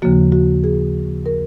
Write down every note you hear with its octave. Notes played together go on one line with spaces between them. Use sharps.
D#2 C#3 F3 A#3 F#4
F#4
G#4
A#4